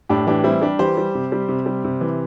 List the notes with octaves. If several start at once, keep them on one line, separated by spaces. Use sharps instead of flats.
A2 D4 G4
E3 D4 G4
G3 C4 E4
G3 D4 G4
E3 G4 C5
G3
C3
G3
C3
G3
C3
E3